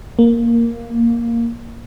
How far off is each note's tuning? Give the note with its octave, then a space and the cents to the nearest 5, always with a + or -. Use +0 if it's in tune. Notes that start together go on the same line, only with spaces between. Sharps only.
A#3 +0